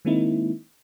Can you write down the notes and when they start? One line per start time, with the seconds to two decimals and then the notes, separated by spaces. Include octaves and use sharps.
0.05 D#3 G#3 A#3 C4 D#4 E4